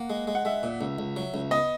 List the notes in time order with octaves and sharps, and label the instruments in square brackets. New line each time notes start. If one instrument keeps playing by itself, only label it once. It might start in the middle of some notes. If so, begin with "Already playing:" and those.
Already playing: [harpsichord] A#3 [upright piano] F#5
[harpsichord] G#3
G#3
[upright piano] F#5
[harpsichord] G#3 [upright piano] E5
[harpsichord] A#2
C#2
C#2
F#3
C#2
[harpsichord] B3 [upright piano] D#5